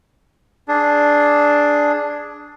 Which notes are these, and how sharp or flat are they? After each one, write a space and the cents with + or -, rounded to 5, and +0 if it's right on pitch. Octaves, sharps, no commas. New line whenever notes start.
D4 +0 G#4 +10